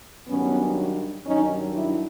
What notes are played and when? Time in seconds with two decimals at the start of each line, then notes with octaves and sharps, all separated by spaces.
0.27 G2 D#3 F#3 B3 C#4
1.26 G2 D#3 F#3 C#4 D#4
1.74 D4 E4